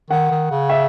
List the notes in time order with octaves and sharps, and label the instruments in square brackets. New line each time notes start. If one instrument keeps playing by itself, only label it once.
[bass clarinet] D#3 [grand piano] F#5
[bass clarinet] D#3
C#3
[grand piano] E5